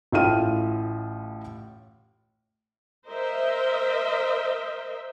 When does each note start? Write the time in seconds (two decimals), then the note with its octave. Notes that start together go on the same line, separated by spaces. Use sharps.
0.12 A1 A2 F4 F6 D#7
3.08 A#4 C5 D#5 E5